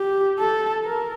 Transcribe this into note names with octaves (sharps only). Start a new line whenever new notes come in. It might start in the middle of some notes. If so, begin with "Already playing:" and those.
Already playing: G4
A4
A#4